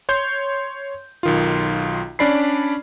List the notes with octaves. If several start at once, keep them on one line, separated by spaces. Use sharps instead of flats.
C#5 C6 G6
B1 D#3 F4
C#4 D4 D5 B5 C7